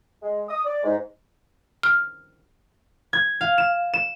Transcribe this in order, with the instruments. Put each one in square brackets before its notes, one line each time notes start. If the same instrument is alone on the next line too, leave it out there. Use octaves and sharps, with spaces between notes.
[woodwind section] G#3
D#6
D5
G#2
[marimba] F6
[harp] G#6
F5
E7
E7